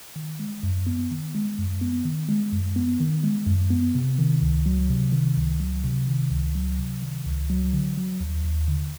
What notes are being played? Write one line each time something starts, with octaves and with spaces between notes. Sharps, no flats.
D#3
G#3
F#2
B3
D#3
G#3
F#2
B3
D#3
G#3
F#2
B3
D#3
G#3
F#2
B3
C3
D#3
C#2
F#3
C3
D#3
C#2
F#3
C3
D#3
C#2
F#3
C3
D#3
C#2
F#3
D3
F#3
D#2
D#2
D3